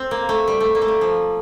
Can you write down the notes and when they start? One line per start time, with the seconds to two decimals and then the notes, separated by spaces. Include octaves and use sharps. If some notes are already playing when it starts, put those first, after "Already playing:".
Already playing: C4
0.11 A#3
0.29 A3
0.48 G3
0.60 A3
0.75 A#3
0.81 A3
0.88 G3
1.01 F3